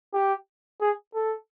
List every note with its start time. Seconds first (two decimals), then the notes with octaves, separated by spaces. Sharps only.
0.13 G4
0.81 G#4
1.15 A4